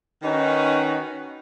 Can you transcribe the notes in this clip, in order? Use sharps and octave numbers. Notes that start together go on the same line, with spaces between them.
D#3 C#4 D#4 F#4 B4